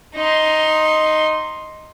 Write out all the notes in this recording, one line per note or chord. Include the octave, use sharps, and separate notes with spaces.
D#4 C6